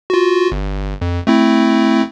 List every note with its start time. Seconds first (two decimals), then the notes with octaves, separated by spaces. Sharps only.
0.10 F4 F#4
0.52 G1
1.01 F2
1.27 A3 C4 E4